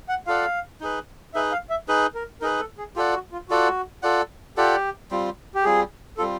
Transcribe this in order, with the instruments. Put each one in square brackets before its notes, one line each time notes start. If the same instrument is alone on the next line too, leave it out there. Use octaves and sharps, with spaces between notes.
[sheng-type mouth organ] F#5
[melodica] F4 A4 D5 F#5 [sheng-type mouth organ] F5
[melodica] D#4 G#4 B4
[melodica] D#4 G#4 B4 [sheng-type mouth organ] E5
[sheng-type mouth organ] F5
E5
[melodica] D#4 G#4 B4
[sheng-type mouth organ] A#4
[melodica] D#4 G#4 B4 [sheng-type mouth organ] A#4
[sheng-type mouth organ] A4
G#4
[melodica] F4 A4 D5 F#5 [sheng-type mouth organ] G4
[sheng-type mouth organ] F#4
F4
[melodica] F4 A4 D5 F#5 [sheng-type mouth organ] F#4
[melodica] F4 A4 D5 F#5
[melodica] F4 A4 D5 F#5 [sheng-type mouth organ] G4
[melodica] G3 C4 F4
[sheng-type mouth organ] G4
[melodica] G3 C4 F4 [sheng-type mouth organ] G#4
[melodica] G3 C4 F4 [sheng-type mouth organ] A4